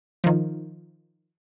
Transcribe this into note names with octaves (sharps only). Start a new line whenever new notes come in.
D#3 F3